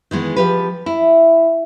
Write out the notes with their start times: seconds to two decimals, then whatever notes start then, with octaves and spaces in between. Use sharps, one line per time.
0.11 D#3 E3 G#3 B3
0.36 F3 G4 B4
0.86 E4